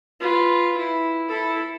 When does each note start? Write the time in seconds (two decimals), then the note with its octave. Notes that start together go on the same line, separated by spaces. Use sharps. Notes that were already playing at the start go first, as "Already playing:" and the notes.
0.20 F4 B4
0.77 E4
1.28 E4 A4